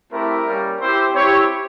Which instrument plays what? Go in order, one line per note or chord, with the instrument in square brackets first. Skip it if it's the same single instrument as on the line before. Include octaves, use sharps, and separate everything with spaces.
[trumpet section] A3 C4 E4 G4 A#4
G3 A#3 C#4
C4 E4 G4 C5
C4 E4 G4 C#5